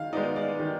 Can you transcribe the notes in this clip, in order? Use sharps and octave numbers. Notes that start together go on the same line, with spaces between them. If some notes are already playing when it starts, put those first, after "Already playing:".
Already playing: D#3 F5
G#3 B3 D#4 D5
D5
D#3